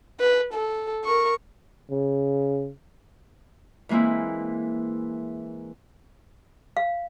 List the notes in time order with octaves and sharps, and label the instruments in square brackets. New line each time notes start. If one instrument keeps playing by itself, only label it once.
[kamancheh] B4
A4
A#4 C#6
[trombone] C#3
[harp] E3 G#3 A#3 C4 E4
[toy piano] F5